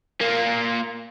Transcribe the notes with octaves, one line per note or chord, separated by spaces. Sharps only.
A#3 F4